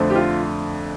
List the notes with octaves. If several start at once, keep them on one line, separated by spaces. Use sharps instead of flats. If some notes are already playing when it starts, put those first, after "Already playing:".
Already playing: F2 D3 A3 C4
G4
F4